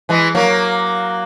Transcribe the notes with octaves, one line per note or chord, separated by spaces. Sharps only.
E3 G#3
F#3 A#3